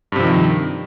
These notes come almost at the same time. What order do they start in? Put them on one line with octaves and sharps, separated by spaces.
G2 C3 F3 D#3